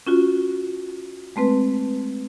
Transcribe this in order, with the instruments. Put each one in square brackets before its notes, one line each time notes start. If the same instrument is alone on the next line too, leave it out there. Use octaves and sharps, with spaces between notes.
[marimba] C#4 F4 F#4
G#3 A3 C4 B4